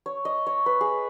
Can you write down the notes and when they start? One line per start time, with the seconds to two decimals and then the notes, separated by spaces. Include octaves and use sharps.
0.06 C#5
0.25 D#5
0.47 C#5
0.66 B4
0.81 G#4